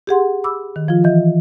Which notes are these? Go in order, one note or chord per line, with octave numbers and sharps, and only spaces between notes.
G4 G#4 F#5 C6
B5 D6 E6
D#3
F3 F4
E3 D#5